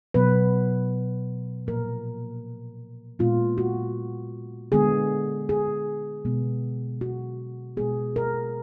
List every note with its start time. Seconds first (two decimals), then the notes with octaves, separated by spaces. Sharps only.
0.14 B2 F#3 B3 B4
1.67 A#2 F3 A#3 A#4
3.19 A#2 G#3 B3 F4
3.58 F#4
4.72 D3 G#3 B3 G#4
5.49 G#4
6.25 B2 G#3 B3
7.01 F#4
7.77 B2 G#3 B3 G#4
8.16 A#4